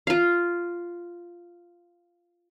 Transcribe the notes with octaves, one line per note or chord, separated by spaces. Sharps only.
F4 F5